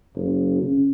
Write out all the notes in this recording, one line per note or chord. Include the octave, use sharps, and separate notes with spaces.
F#1
C#3